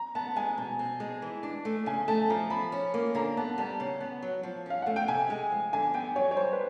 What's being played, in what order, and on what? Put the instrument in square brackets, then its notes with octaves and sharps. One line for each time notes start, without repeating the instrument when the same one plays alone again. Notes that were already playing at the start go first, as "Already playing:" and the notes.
Already playing: [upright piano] A#5
[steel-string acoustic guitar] B3 [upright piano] A5
[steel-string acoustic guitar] G#3 [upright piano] G#5
[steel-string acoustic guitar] B2
C4
G#3
E3
D4
A3
[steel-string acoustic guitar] C#3 [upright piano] G#5
[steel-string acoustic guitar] A3 [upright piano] A5
[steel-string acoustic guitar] F3 [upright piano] A#5
[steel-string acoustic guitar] F3 [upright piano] B5
[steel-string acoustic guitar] C#4
A#3
[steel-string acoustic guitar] D3 [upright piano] A#5
[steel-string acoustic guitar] B3 [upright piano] A5
[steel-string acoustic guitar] G3 [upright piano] A5
[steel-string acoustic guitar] C#3
B3
F#3
F3
[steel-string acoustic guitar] C#4 [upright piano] F5
[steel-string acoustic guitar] A3 [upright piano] F#5
[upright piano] G5
[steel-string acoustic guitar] C3 [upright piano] G#5
[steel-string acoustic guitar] G#3
F3
[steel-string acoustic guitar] D3 [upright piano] G#5
[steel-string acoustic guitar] B3 [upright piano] G5
[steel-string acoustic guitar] F#3 [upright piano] C#5
[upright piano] C#5
[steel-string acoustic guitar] G3 [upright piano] C5
[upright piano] B4